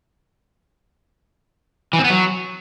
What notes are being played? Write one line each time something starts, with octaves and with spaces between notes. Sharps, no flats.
E3
C4
B3
F#3